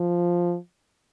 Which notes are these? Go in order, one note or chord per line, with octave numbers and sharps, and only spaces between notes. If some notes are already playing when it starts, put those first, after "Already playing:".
Already playing: F3